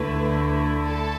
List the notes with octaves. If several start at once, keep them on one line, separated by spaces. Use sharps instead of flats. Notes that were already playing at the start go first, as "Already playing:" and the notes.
Already playing: D2 D3 A3 E4 B4
A4